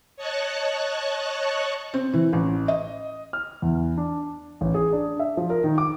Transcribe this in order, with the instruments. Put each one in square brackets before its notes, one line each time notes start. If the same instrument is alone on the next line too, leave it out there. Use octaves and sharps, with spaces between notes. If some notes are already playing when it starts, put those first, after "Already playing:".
[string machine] C#5 D#5 A5 C#6 F#6
[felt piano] C4
E3
A1
D#5
[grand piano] F6
E2
D4
A1
G#4
D4
E5
F3
A#4
D#3
D6